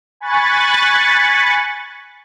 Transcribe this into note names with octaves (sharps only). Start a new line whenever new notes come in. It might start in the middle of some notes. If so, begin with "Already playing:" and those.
G#5 B5 C#6 F#6 A6